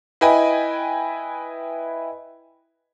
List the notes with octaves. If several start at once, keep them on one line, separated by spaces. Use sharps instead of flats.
E4 B4 D#5 G5 G#5 B5